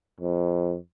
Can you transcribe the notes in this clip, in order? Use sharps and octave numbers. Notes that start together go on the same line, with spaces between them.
F2